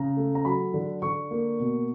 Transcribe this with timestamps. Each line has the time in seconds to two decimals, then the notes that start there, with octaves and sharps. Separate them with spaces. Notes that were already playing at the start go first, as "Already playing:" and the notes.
Already playing: C#3 A#5
0.17 A3
0.35 A#5
0.45 F#3 B5
0.74 D3
1.02 D3 C#6
1.31 A#3
1.60 B2